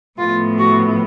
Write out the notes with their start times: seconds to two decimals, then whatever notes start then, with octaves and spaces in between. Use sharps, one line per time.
0.18 A2 F3 B3 F4
0.58 F#4